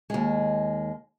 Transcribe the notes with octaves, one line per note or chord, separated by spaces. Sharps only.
D#2 G#3